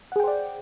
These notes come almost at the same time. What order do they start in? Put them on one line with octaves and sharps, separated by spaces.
F#5 G#4 G5 C5 D5